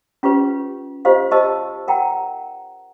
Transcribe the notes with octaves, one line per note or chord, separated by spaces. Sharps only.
C#4 F4 G4 B4
F4 G4 C5 D#5 F5
G4 C5 D#5 A5 E6
A#4 F#5 G5 A#5